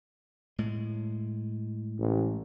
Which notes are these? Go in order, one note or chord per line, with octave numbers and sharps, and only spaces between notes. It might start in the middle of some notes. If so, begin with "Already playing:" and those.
A2 G#3
A1